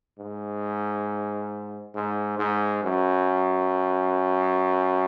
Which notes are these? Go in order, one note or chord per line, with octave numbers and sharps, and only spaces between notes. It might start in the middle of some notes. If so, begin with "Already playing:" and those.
G#2
G#2
G#2
F#2